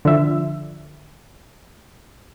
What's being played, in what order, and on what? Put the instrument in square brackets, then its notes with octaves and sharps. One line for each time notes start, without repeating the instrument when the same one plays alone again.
[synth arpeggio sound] D3 F3 E5